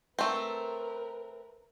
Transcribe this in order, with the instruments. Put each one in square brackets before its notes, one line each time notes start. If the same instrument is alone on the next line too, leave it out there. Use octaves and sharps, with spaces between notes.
[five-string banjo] A3 C4 [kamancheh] A#4 B4